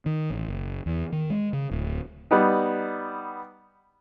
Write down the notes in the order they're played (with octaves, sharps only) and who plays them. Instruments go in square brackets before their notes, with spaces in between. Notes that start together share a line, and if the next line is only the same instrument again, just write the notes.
[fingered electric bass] D#3
A1
F#1
E2
D#3
G#3
C#3
D1
[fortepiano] G3 B3 D#4